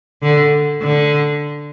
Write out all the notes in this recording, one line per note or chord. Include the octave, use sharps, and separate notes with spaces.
D3
D3